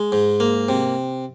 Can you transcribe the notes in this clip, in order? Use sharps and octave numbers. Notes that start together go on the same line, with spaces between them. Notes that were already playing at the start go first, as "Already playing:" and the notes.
Already playing: G#3
G#2
A#3
C3